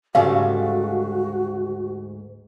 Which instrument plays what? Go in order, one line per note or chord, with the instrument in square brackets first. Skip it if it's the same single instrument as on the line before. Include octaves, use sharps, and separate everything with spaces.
[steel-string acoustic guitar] D2 G#2 G#4 [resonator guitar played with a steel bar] C#3 G3 A3 [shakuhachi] F#4 [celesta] F5